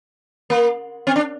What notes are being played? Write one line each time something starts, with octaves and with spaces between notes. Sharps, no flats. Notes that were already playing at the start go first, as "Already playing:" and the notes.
A#3
C4
D4